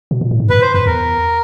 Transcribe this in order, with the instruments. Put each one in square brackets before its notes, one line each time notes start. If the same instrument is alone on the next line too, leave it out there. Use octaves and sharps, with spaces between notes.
[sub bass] B2
A#2
A2
G#2
[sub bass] G2 [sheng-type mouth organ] B4
[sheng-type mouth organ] C5
[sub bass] F2 [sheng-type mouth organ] B4
[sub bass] E2 [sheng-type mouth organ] A#4